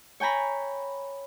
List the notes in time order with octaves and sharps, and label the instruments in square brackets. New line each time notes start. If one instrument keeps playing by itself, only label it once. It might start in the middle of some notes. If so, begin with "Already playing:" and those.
[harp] C#5 G5 G#5 A#5 B5